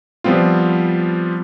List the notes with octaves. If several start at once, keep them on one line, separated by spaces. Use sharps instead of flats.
F3 G3 B3 C4 F4